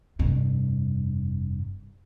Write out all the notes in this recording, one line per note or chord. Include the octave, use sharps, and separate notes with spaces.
F1 G2